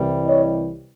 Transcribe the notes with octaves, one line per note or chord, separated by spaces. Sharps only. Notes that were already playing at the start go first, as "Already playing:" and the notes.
Already playing: C2 C3 E3 G3
C#5 D#5